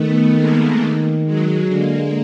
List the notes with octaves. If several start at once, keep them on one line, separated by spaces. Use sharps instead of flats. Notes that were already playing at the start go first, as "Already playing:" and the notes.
Already playing: D#3 A3 B3
G#3 A#3
D#3
F#3 G#3
D3 G#3 A#3